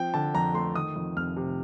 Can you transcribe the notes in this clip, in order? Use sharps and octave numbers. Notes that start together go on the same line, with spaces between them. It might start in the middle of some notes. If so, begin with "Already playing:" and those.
Already playing: F3 C4 G5
D3 A5
F2 A#5
A3 C6
D#3 D#6
F2
F1 F6
C3